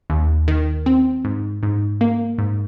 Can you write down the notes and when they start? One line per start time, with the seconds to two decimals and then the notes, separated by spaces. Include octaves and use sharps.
0.10 D#2
0.48 D#3
0.86 C4
1.25 G#2
1.63 G#2
2.01 A#3
2.38 G#2